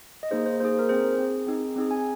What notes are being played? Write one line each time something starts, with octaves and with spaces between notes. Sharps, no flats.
D#5
A#3 D#4 G#4 C5
C5
A#3 D#4 G#4 C5
A#4
C4 G#4 C5
C4 G#4
C4 D#4 G#4
C4 D#4 G#4
G#5